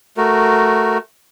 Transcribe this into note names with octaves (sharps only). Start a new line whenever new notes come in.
A3 F#4 A#4